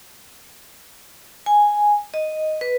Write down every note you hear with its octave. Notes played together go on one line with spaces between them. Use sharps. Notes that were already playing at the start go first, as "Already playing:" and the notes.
G#5
D#5
B4